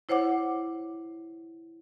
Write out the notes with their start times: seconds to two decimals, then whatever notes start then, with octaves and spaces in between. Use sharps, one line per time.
0.09 E4 C5 C#5 F#5 D6